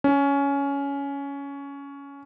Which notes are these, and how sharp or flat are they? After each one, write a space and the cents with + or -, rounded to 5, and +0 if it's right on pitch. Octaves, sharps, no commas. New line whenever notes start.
C#4 +15